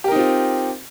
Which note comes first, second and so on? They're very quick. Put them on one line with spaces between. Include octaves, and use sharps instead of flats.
G4 A#4 D#4 C4 F4